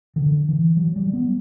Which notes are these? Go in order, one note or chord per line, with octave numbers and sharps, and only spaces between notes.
D#3
D3
E3
F#3
G3
B3